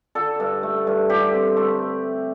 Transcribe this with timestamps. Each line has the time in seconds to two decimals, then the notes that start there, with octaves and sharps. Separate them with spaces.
0.15 D3 A4
0.40 G2
0.63 A3
0.87 G2
1.10 D3 G4
1.33 C4
1.57 A3